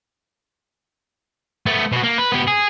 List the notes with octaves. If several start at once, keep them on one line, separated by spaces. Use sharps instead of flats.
A3 B3
B2 F#4
A#3
B4
B3 G4
G#4